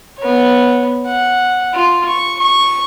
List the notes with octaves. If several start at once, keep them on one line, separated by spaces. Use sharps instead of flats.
B3 C#5
F#5
F4
C#6
C#6